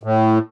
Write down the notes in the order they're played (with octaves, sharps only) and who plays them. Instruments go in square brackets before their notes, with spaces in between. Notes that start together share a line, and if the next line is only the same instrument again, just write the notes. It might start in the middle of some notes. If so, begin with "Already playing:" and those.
[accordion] A2